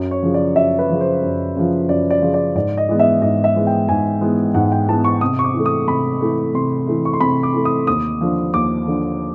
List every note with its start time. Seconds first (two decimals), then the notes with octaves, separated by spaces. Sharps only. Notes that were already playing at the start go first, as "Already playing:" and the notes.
Already playing: F#2
0.11 C#5
0.23 C#3 F3
0.34 D5
0.55 F#2 E5
0.79 B4
0.89 C#3 F3
1.01 C5
1.22 F#2
1.56 C#3 F3
1.89 F#2 D5
2.11 D5
2.22 C#3 F3
2.34 D5
2.55 G#2 D5
2.77 D#5
2.89 E3 G#3 B3
2.99 E5
3.22 G#2 D#5
3.44 E5
3.56 E3 G#3 B3
3.67 G5
3.89 G#2 G#5
4.21 E3 G#3 B3
4.54 G#2 F#5
4.72 G5
4.88 E3 G#3 B3 A5
5.04 C#6
5.21 C3 D#6
5.39 C#6
5.44 D6
5.54 E3
5.59 A3
5.66 D#6
5.87 C3 B5
6.21 E3 A3
6.54 C3 C6
6.87 E3 A3
7.05 C#6
7.13 C6
7.21 C3 B5
7.43 D6
7.54 E3 A3
7.65 D#6
7.87 D#2 D#6
8.21 D3 F3
8.54 D#2 D6
8.88 D3 F3